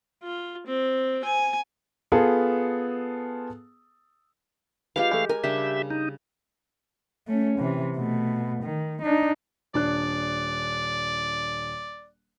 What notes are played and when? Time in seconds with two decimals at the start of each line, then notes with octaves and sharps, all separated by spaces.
0.23 F4
0.67 C4
1.24 G#5
2.12 B3 F4 G#4 A4
4.96 G#3 F4 G4 B4 F5 B5
5.11 E3 A3
5.29 A#4 G#5
5.44 C#3 G3 D4 G4 E5
5.90 D#4
7.27 A3 C#4
7.59 C3 E3
7.97 B2 A3
8.63 D#3
9.02 D4 D#4
9.74 D#1 D4 D5 F#6